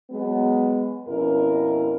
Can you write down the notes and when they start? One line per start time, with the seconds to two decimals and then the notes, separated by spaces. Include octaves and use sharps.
0.11 F#3 G#3 B3
1.08 F2 B2 C#4 E4 A#4